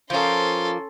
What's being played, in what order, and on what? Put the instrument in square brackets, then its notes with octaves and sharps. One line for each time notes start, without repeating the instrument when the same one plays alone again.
[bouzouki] F3 A#3 [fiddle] C#4 A4 [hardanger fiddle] C6